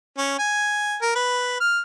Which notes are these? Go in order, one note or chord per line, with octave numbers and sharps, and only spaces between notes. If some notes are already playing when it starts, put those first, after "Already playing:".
C#4
G#5
A#4
B4
F6